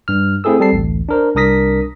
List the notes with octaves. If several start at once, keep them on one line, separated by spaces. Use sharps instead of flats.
G2 F6
A3 C4 E4 G#4 A4 E6
G3 C4 A4 A5 C7
A1 D2
D4 A#4 C5
C2 D4 A#4 D#6 A#6 B6